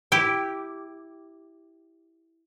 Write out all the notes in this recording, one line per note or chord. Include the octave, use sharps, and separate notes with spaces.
E4 G4